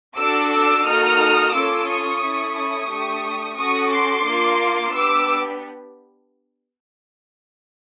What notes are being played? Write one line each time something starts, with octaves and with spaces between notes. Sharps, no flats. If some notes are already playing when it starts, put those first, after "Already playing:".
D4 F#4 A4 D6 E6
D6 E6
A#3 D#4 F#4 A4 D#6 F6
C#4 F4 A4 D6 E6
C#6 D#6
C#4 E4 A4
C#6 D#6
A3 D4 G4
C#4 F#4 A4 C#6 D#6
C6 D6
A#3 D4 F4
B3 D4 G4 D6 E6